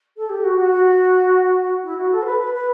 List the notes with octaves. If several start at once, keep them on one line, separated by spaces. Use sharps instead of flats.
A4
G4
F#4
F#4
F#4
E4
F#4
A4
C5
B4
B4
B4